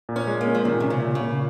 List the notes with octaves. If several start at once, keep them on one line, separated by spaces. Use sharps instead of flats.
A#2
C#4
G#3
A#3
C#4
F3
A#2 D#3
C3 C#4
C#3
A#2
C#3
A#2